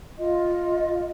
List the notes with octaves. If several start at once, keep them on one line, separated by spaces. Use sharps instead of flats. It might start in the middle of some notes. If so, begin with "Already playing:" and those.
F4 D#5